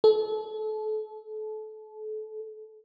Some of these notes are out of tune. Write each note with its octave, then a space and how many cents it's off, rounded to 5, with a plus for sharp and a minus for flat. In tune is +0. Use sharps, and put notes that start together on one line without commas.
A4 -30